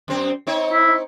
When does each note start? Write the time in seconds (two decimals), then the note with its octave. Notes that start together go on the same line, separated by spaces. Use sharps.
0.08 F#2 C4
0.47 C4 D#4 C#5
0.73 E4